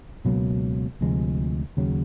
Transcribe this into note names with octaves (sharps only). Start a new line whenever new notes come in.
C#2 B2 F#3 A#3
D2 C3 F3 G#3
D#2 C#3 F#3